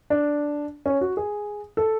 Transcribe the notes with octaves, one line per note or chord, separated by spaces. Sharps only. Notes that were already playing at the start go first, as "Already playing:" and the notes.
D4
C#4
F#4
G#4
A4